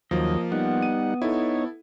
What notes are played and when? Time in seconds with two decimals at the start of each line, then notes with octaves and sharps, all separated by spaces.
0.11 D#2 F3 F#3 A#3 D#5
0.52 G3 B3 D#4 F#5
0.82 D#7
1.22 D#4 E4 A4 C#5